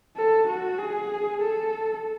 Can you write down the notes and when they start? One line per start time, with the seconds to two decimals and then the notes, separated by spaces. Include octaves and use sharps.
0.17 A4
0.47 F#4
0.79 G#4
1.41 A4